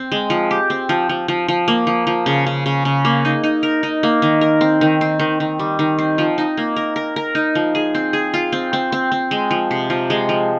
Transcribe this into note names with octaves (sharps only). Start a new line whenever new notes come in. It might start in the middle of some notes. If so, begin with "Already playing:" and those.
Already playing: C4
G#3
F3
G4
C4
F3
F3
F3
F3
A#3
F3
F3
C#3
C#3
C#3
C#3
A#3
D#4
D#4
A#4
D#4
A#3
D#3
A#4
C4
D#3
C4
D#3
D#3
G3
D#3
C4
F3
D#4
A#3
A#4
A#4
A#4
D#4
F3
G#4
C4
G#4
F4
C4
C4
C4
C4
G#3
F3
C3
F3
G#3
F3